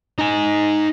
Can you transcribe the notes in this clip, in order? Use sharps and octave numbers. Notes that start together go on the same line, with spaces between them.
D#4 G#5